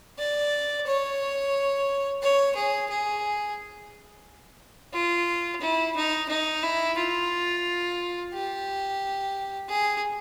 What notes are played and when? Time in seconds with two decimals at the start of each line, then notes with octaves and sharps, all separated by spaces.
0.19 D5
0.86 C#5
2.22 C#5
2.56 G#4
2.90 G#4
4.93 F4
5.61 E4
5.96 D#4
6.29 D#4
6.63 E4
6.98 F4
8.34 G4
9.69 G#4